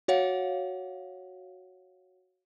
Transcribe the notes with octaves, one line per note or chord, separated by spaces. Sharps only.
F#4 C#5 F5 F#5